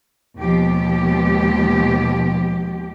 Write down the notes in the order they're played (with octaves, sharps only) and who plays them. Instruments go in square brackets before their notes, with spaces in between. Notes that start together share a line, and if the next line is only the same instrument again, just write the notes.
[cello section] D#2 B2 F3 G#3 G4